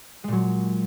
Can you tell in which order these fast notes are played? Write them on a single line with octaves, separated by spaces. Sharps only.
G#3 A#2 F#3